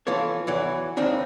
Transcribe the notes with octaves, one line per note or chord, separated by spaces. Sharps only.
E3 F4 A4 C#5
E2 E3 F#3
C#2 D#3 C4 D4 D#4